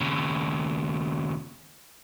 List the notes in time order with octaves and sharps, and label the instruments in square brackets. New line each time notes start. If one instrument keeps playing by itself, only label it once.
[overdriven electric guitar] D#2 C#3